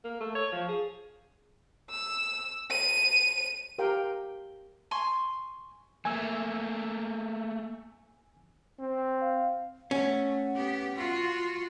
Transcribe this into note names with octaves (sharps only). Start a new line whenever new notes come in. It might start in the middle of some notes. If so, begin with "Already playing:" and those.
A#3
A3
C#5
F3
G#4
E6
D#7
G4 A#4 F5 G5
G#5 C6 C#6
A3 A#3 G#5 E6
C4
F5
A3 C#4 F#5
B3 G4
F4 F#4